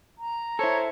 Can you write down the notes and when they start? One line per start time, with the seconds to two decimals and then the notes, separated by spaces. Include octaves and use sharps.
0.18 A#5
0.59 E4 A4 C5 C#5